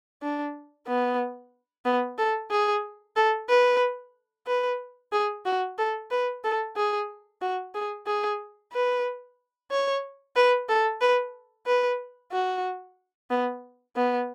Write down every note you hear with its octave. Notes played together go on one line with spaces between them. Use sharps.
D4
B3
B3
A4
G#4
A4
B4
B4
G#4
F#4
A4
B4
A4
G#4
F#4
G#4
G#4
B4
C#5
B4
A4
B4
B4
F#4
B3
B3